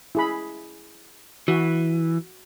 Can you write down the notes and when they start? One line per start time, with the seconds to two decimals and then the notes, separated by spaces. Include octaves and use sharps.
0.15 E4 G#4 B5
1.48 E3 F#4